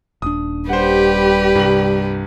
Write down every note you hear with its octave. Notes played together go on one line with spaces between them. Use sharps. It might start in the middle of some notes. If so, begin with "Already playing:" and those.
D#1 D4 D#6
G3 G4 B4 C5 F#5
C2 G2 F#7